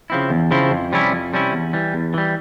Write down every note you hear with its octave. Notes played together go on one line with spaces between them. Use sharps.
C#3 F3 C4 E4
E2
C#3 F3 C4 E4
F2
C3 G3 C#4 E4
F2
C3 G3 C#4 E4
E2
E3 G3
E2
E3 G3